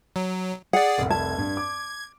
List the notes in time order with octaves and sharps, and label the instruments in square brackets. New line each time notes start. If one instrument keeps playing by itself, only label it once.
[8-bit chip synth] F#3
[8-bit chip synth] G#4 D5 [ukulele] F#5
[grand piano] F1 C2
[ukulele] A5 [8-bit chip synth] G#6
[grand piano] G2
D6